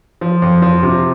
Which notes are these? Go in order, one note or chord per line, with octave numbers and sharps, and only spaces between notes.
F3
F2
F3
C3